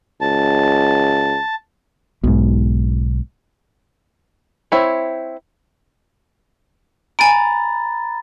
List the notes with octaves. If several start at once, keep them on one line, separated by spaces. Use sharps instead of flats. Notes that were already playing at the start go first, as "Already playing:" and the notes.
C#2 A5
B1 G#2 B2
C4 E4 C#5
G#5 A#5 B5 A6 D7